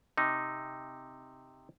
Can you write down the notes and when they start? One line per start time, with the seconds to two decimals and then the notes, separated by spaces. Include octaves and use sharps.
0.17 C3 D#4